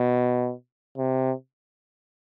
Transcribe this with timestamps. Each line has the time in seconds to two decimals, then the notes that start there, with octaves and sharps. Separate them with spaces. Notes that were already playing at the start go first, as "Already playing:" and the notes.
Already playing: B2
0.98 C3